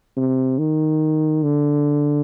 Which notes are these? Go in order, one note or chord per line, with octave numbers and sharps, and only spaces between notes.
C3
D#3
D3